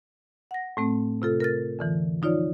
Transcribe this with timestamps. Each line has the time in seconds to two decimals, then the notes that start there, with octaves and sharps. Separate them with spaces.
0.51 F#5 A#6
0.77 A2 A3 C4
1.22 C3 F4 A4
1.40 A#4 F6 A6
1.79 F2 D3 E3
2.22 F3 D#4 F4 C#5 D5